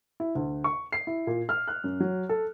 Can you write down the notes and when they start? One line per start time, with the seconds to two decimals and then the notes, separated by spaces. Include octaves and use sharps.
0.20 E4
0.35 D2
0.64 C#6
0.93 C7
1.07 E4
1.27 A#2
1.49 F6
1.68 F#6
1.84 F#2
2.00 F#3
2.29 A4